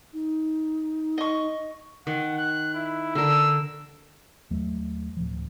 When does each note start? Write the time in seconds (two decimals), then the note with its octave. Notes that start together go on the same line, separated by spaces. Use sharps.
0.13 D#4
1.18 D#5 C#6
2.07 D#3 F#5
2.38 F#6
2.74 E4
3.15 D3 A#4 E6
4.50 D#2 F#3 A3
5.17 D1 F3